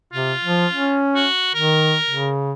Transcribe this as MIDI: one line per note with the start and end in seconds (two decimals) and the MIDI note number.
0.13 0.33 48
0.13 1.03 65
0.44 0.67 53
0.73 1.26 61
1.15 1.51 66
1.54 1.97 51
1.54 2.34 70
2.10 2.52 49